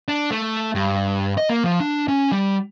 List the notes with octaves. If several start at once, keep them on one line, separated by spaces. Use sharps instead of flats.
D4
A3
G2
D#5
A#3
F3
D4
C#4
G3